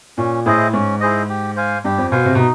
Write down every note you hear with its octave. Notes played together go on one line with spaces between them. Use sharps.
A#2 C#4
A2 E4 G#4 C5 D#5
G#2 C#4
E4 G#4 C5 D#5
G4
C5 F5 G#5
G2 G4
F2
B2 C5 F5 G#5
C3
B2 D#4